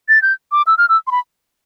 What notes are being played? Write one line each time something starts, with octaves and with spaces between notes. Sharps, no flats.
A6
G6
D6
E6
F6
E6
C6
B5